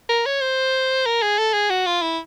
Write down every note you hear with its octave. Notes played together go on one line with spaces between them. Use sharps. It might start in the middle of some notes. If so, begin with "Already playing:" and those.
A#4
C#5
C5
A#4
G#4
A4
G#4
F#4
F4
E4